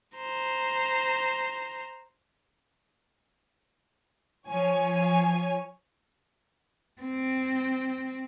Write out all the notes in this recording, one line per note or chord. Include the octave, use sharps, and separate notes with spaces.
C5 A#5
F3 C#5 G#5
C4